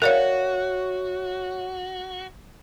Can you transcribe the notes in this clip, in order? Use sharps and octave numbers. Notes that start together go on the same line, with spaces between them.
F#4 A#4 C#5 D5 E5 F5